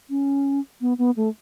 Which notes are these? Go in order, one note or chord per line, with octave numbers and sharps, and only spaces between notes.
C#4
B3
B3
A3